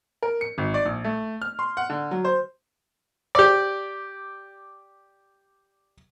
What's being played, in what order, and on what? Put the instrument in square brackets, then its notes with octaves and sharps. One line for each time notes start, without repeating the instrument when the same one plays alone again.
[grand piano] A#4
C#7
G#1
D5
A#1
A3
F6
C6
F#5
D3
F#3
C5
[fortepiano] G4 D5